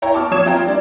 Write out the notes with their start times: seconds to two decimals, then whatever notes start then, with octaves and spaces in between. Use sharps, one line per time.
0.02 E4 C#5 G5 A#5
0.14 A5 C#6 D6 F6
0.31 F3 C#5 D#6 G#6 E7
0.45 C4 F4 E5 G5 A#5
0.65 G3 D4 D5